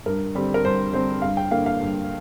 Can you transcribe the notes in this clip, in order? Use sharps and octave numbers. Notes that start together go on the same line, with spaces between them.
G2 A#4
D3 G3 C4
A#4
G2 C5
D3 G3 C4 C5
G2 F5
G5
D3 A#3 F5
F5
G2